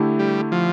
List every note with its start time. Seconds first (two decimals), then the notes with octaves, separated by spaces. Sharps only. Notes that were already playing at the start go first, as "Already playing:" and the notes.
Already playing: D3 A3 E4 G4
0.19 G3
0.52 F3